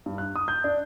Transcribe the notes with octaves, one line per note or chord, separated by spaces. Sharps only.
G2
F#6
D#6
G6
D4